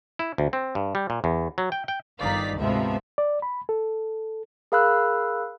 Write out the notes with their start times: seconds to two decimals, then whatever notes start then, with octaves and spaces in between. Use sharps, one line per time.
0.19 E4
0.38 D2
0.53 C4
0.75 G2
0.95 G3
1.10 A#2
1.24 E2
1.58 F#3
1.72 G5
1.88 G5
2.18 G1 D#3 D#4 D5 F5 B6
2.56 D2 G#2 C3 F3 B3 E5
3.18 D5
3.42 B5
3.69 A4
4.72 G#4 A#4 F5 B5 E6 F#6